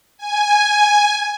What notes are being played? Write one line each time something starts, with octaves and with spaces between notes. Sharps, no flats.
G#5